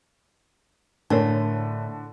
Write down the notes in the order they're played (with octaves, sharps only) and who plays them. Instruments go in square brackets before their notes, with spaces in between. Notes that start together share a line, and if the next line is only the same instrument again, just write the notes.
[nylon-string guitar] A2 C5 [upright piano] D3 [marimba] A3 A#4 C#5 [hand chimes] A5